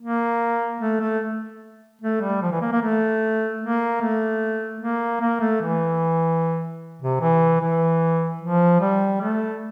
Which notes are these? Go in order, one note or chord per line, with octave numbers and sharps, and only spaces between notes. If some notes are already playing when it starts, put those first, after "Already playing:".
A#3
A3
A3
A3
G3
F3
E3
A#3
A#3
A3
A#3
A3
A#3
A#3
A3
E3
C3
E3
E3
F3
G3
A3